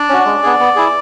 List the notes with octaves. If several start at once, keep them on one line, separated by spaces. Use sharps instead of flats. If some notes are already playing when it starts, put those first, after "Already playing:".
Already playing: D4 D5
C#4 F#4
G#3
B3 D4 G#4
B3
E4 G#4